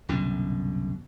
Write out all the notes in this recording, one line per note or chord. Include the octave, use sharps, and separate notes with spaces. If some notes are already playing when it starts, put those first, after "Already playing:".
C2 F#2 B2 D3